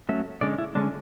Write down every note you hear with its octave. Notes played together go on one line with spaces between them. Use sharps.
F#3 A3 C#4 E5
D3 G#3 C#4 D5
E4
D3 G#3 C#4 D4